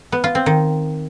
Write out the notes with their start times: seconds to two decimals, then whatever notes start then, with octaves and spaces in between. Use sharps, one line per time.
0.12 B3
0.24 F4
0.35 C4
0.46 D#3